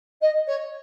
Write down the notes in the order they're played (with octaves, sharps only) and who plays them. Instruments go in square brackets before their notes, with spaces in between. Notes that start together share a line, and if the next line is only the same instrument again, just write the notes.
[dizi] D#5
C#5